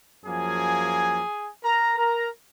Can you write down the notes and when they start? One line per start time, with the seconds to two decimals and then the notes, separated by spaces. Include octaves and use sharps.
0.25 F#2 F3 A#3 G#4 G#5
1.64 A#4 A#5
1.98 A#4 A#5